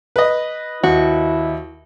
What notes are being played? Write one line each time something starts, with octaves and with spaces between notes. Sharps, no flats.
B4 D#5
D#2 E4 F#4